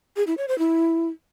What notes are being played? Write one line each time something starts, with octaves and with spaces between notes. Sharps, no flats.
G#4
E4
C#5
C5
E4